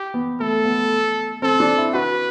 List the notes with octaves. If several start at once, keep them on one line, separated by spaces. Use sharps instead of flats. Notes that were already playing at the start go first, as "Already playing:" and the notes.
Already playing: G4
B3
A3 A4
B3
C4 A4
D4
E4
F#4 B4